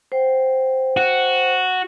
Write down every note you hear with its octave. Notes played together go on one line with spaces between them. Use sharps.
C5 F#5 G5
F#4